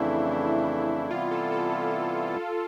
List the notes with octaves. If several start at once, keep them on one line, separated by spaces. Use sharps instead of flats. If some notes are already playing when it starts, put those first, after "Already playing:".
Already playing: F2 C#3 E3 A3 D4 E4
C3 E3 G3 B3 E4 F4
A4
A4